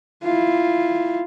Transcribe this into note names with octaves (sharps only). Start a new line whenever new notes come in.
E4 F4